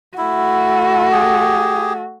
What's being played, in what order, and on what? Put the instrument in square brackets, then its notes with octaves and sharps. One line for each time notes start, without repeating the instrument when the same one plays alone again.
[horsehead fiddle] A3 F#4 [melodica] E4
[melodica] G4 G#4